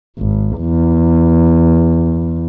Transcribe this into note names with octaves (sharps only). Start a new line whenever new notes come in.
G#1
E2